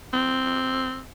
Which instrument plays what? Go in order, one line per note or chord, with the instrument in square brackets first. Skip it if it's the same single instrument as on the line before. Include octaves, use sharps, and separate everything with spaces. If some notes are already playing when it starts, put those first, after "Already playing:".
[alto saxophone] C4